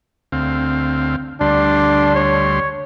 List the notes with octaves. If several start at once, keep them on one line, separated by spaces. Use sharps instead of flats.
D2 C4 F5
D2 G3 D4 C6
C#5